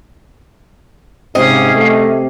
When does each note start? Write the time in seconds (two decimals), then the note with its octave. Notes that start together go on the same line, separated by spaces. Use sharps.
1.35 G#2 C3 C#4 D#5 F5 D6
1.76 A3